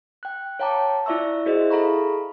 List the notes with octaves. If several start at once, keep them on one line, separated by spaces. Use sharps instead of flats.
G5 F#6
C#5 F5 G5 A5 A#5 D6
E4 F4 D5 E5 C#6 E6
E4 F#4 G#4 C5 D#5 E5
G#4 A4 F5 A#5 B5 C#6